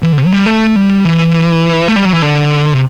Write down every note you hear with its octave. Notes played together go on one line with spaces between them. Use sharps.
E3
D3
C3
F#3
G3
A3
G3
E3
A3
G3
F#3
E3
D3
C3